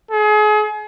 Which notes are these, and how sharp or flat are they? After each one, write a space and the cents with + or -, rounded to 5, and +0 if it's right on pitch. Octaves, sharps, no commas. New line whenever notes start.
G#4 +35